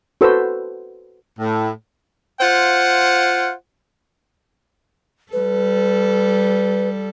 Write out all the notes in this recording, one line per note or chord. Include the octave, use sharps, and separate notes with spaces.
F#4 A4 B4 C5 E6
A2
F4 C5 F5 F#5
G3 A4 B4